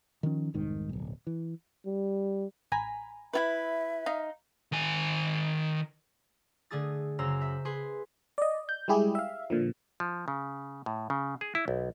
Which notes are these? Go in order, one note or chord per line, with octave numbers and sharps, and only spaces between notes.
D#3 F3 C#4
F1 C2 G#2 D#3
D1 B1
E3
G3
A1 G#5 A#5 B5
E4 F4 B4 E5
D#4 D#5 F5
D#3 G#5
D3 A3 G#4 D#6 A6
F#2 C#3 C5 A#5 E6
E5 G6
G#4 B4 C6
D5 D#5
G6
G3 G#3 E4 G4 G#4
E5 F5
A#2 D3 F3
F3
C#3
A2
C#3
G#4
E4
B1